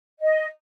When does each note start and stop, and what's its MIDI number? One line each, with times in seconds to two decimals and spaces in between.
0.21 0.44 75